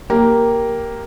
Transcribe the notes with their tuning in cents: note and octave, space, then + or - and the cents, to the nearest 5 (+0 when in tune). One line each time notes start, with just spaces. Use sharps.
A#3 +0 G4 +0